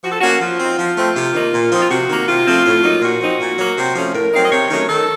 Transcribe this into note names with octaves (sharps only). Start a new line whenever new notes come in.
F3 F#4
A4
A#3 C#4 F#4
F3 F4
C4 D#4
F3
A3 C4
C3
D#3 A#3 D#4
A#2
F3 C4 D#4
F4
C3 F#4
D#3 A#3
C3 F4
F3 A3 C4
A2
F#3 A#3 D#4
A#2 F#4
F3 C4 D#4
A#2
F#3 A#3
C3
F3 A3 C#4
A2 A#4
F#3 C4 D#4 F5
D#5
C3 C#5
D#3 F#3 A3 C#4
D#3 A4